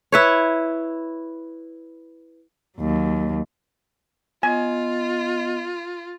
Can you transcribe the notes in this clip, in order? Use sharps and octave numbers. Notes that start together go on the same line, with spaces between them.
E4 B4 C#5
D#2 F#3
B3 F4 D#5 G#5